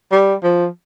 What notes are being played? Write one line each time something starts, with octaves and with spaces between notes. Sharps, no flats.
G3
F3